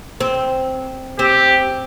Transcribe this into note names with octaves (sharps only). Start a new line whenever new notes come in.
C4
C4 G4